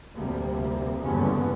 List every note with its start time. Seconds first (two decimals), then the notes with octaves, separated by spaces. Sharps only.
0.14 F1 D2 C3 G3 A#3
0.99 F#1 E2 G2 D3 B3 C#4